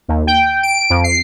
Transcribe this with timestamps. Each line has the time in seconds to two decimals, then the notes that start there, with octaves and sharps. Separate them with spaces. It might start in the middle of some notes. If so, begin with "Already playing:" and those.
0.08 D#2
0.27 G5
0.63 D7
0.90 F2
1.04 C7